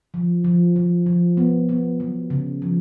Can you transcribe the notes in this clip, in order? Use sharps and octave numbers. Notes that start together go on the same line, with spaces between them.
F3
F3
F3
F3
B3
B3
F#3
C#3
F3